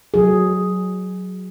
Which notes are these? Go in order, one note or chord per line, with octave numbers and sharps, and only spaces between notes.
F#3 G#4